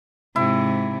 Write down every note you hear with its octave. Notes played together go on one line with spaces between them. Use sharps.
G#2 C3 E4